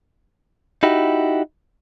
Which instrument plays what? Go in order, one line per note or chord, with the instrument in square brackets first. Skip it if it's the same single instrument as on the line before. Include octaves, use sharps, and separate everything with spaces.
[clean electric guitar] D#4 E4 F#4 G4